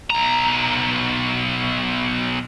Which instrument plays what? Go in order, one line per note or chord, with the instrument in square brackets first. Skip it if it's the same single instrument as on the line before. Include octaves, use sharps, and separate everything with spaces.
[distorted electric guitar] B1 A#5